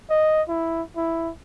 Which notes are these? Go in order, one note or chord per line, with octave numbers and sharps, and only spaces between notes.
D#5
E4
E4